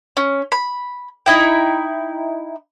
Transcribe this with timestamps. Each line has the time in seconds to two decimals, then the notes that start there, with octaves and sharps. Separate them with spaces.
0.17 C#4
0.52 B5
1.26 D#4 E4 G5